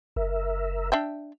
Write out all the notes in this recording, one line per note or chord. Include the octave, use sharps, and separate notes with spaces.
F#1 A#4 E5
D4 E5 G5